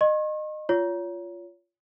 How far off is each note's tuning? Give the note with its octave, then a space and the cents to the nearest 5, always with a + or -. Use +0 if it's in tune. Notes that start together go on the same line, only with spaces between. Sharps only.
D#5 -25 C#6 -45
F4 -10 C#5 +30